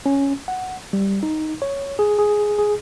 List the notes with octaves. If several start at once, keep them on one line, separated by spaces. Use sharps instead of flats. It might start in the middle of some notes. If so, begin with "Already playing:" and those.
C#4
F#5
G3
D#4
C#5
G#4
G#4
G#4